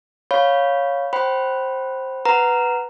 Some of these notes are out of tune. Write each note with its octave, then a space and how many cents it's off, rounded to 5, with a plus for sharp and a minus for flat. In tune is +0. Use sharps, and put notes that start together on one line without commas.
C#5 +0 F5 +5 B5 +0
C5 +10 G5 -30 B5 +0
B4 +0 F#5 +0 A#5 +0